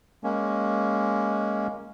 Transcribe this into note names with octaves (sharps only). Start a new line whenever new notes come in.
G#3 A#3 C#4